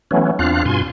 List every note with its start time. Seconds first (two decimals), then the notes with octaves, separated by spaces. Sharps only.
0.11 E3 F#3 A3 B3 C#4
0.39 E2 C4 D4 F4 F5 F#6
0.65 G2 B2 F4 G#5 C6